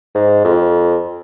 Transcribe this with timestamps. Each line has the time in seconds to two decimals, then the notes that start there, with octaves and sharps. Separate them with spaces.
0.15 G#2
0.44 F2